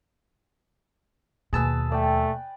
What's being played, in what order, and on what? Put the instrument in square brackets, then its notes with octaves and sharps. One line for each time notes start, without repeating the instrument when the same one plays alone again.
[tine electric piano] D#2 A5 E6 [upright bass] B2 A#3 [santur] G#4 B4
[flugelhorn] A3 [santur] D5 G5